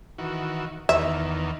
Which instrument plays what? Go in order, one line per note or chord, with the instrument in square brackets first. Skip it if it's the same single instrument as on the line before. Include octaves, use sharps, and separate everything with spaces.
[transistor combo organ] D#3 E3 F#4
[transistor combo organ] E2 D#3 [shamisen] E5